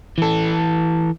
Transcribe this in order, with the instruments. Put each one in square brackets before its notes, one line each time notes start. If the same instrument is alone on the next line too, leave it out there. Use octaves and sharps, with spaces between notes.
[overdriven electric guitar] E3 A4